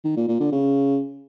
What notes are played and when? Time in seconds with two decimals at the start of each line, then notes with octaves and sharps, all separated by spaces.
0.04 D#3
0.16 A#2
0.28 A#2
0.40 D3
0.52 C#3